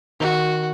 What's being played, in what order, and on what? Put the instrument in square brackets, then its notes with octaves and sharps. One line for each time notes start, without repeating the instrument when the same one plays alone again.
[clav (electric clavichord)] D#3 [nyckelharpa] F#4